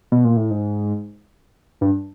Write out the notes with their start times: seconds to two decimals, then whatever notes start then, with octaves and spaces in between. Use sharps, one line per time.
0.12 B2
0.25 A#2
0.37 A2
0.51 G#2
1.81 G2